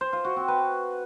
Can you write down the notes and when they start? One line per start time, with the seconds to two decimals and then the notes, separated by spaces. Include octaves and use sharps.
0.01 C5
0.13 F4
0.25 F#4
0.36 C4
0.48 B4